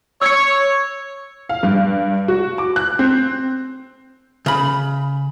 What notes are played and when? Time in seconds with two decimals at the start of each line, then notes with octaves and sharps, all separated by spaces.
0.21 C#5 E6 G#6 C#7
1.49 F5
1.63 G2
2.28 F#4
2.58 D6
2.76 F#6
2.99 C4
4.46 C#3 B5